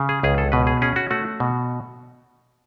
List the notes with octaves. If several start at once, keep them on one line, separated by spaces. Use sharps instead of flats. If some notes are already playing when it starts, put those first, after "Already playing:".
Already playing: C#3
G#4
C#2 G#4
A4
B2 B4
G#4
C#4 G#4
F#4
A3 F#4
B2